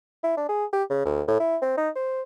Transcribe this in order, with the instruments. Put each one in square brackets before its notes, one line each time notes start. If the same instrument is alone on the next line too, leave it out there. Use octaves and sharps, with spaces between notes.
[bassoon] E4
D4
G#4
G4
C#3
D2
A2
E4
C4
D#4
C5